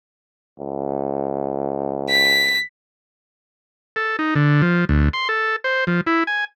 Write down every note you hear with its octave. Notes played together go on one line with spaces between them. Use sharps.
C#2
B6
A4
D#4
D3
F3
D2
C6
A4
C5
F3
E4
G#5